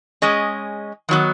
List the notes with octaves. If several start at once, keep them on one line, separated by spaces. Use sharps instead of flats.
G#3 C#4 G#4 D#5
D#3 F#3 B3